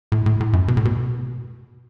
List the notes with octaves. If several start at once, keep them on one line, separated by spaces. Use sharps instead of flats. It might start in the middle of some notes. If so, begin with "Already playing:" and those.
A2
A2
A2
F#2
B2
A2
B2